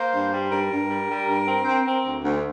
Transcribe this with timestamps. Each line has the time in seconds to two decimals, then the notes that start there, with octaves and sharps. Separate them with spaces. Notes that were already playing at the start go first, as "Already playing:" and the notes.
Already playing: A#3 C5
0.12 G2
0.31 G3
0.50 G2 A#4
0.70 G2
0.88 G3
1.08 G3
1.27 G2
1.46 C4
1.65 C4
1.84 C4
2.03 D2
2.22 D2